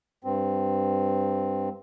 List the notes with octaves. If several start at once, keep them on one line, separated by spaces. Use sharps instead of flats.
G2 C4